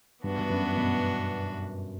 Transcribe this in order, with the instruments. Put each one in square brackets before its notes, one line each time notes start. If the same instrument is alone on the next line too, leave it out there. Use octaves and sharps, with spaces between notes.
[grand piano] G2 [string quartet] E3 B3 D4 F#4
[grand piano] G2
F#2
G2 B2